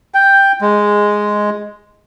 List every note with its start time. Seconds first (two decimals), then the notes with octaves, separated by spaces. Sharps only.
0.14 G5
0.61 G#3